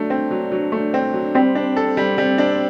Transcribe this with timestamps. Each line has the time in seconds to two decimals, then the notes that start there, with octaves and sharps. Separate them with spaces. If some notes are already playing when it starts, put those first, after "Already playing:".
Already playing: F#3 A3 D4
0.10 C4
0.31 F#3
0.52 F#3
0.72 A3
0.94 C4
1.14 F#3
1.35 G3 C4
1.55 D4
1.76 A4
1.97 G3
2.18 G3
2.38 D4